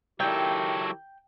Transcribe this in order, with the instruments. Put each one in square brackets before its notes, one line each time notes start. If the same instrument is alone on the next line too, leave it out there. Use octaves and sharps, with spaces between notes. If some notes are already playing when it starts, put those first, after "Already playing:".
[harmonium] D#3 E4 G4 [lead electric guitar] F#3 A4 [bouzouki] G5